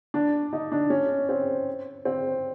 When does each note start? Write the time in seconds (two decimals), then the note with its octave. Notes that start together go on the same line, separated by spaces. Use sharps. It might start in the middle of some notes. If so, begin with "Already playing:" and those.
0.14 D4
0.53 D#4
0.72 D4
0.90 C#4
1.29 C4
2.05 C4